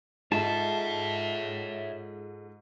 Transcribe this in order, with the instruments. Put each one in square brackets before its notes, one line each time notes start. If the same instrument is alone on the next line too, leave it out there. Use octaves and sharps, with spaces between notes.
[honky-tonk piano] G#2 [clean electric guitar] F4 G#4 A4 [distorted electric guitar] C#5 E5 [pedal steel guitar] A5